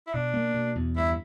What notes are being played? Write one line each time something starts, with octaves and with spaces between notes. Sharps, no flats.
E4
B2 D4
A#3
B2
E2
G2 E4